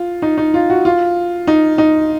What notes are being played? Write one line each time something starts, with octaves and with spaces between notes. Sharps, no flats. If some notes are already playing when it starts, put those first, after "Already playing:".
Already playing: F4
D#4
D#4
F4
F#4
F4
D#4
D#4